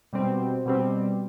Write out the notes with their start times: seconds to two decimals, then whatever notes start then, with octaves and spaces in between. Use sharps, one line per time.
0.13 B2 G3 C4
0.66 B2 G3 C4